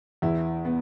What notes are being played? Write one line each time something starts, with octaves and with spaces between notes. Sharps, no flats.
E2 E4
B3